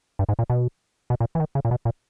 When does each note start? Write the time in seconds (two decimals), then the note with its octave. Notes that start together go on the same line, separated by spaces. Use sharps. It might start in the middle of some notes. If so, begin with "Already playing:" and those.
0.19 G2
0.29 G#2
0.39 A#2
0.50 B2
1.10 B2
1.20 A#2
1.35 E3
1.40 D#3
1.55 C#3
1.65 A#2
1.71 B2
1.85 A#2